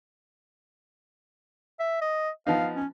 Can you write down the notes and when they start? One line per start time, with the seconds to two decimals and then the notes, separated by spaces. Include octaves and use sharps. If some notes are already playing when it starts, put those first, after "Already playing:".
1.79 E5
2.01 D#5
2.47 F3 B3 D#4 F5
2.76 C#4